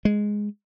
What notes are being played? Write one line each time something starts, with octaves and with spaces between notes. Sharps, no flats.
G#3